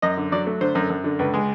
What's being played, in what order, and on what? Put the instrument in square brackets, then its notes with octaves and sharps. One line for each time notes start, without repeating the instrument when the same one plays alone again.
[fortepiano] F#2 D#5
D3
F#3 D5
A3
D3 C5
F#2
F#2
D3
C#2 B4
G#3